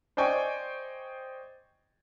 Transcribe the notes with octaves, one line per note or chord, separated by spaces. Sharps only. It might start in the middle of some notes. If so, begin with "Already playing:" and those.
C5 D5 D#5 G5 G#5 C#6